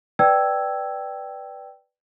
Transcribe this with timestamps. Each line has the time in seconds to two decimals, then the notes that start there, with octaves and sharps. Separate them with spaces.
0.19 B4 D5 G5 A5 E6 G#6